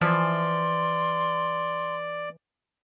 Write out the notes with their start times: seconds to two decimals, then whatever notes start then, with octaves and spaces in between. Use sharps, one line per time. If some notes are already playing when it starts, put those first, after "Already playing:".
0.01 E3 F3 D5 C6